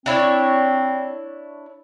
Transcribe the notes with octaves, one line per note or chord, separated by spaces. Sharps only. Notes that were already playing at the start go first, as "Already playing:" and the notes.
C4 D4 E4 C#5